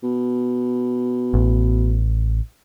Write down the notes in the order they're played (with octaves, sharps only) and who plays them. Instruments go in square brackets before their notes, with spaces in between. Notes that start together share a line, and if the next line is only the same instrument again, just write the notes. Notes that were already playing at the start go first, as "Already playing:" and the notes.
[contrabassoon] B2
[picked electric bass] A1